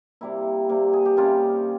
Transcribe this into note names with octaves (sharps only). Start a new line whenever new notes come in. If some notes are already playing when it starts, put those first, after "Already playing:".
C3 G3 A#3 E4
C3 G3 A#3
G#4
G4
C3 G3 A#3 C#4 F4